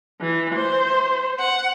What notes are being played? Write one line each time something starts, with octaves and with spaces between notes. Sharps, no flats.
E3
C5
F#5